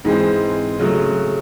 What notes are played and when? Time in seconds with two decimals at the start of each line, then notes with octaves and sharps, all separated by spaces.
0.05 G#2 E3 G#3 C4
0.79 C#3 F#3 A3